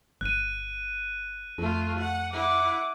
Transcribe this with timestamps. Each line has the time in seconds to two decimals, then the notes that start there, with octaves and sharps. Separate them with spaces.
0.21 G1 F#6 D#7
1.58 F2 A3 F4
1.99 F#5
2.33 E4 F#5 D6